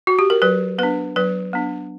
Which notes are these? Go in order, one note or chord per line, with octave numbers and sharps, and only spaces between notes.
F#4
G4
A#4
F#3 B4
B3 D4 B4
F#3 B4
B3 D4